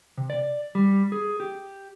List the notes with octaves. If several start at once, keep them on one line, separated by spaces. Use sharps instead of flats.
C3
D5
G3
G#4
G4